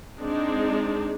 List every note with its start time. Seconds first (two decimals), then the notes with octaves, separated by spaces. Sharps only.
0.20 G#3 C4 D4 D#4 G#4